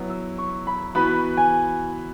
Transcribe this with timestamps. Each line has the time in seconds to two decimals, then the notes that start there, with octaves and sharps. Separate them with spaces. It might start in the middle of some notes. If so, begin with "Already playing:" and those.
Already playing: F#3 B3 E4
0.10 E6
0.38 C#6
0.67 B5
0.95 E3 B3 F#4 B4 B5
1.37 G#5